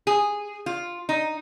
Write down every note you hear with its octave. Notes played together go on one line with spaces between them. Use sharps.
G#4
F4
D#4